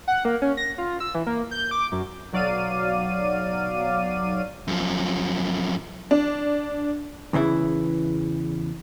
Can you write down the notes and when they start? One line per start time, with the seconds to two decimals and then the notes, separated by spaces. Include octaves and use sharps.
0.08 F#5
0.25 A#3
0.42 C#4
0.57 A#6
0.78 F4
1.00 E6
1.15 E3
1.27 A#3
1.51 G6
1.71 D6
1.92 F#2
2.32 B1 F#3 D5 F5 D#7
4.68 F#2 F3
6.11 D4
7.33 E2 C#3 E3 E4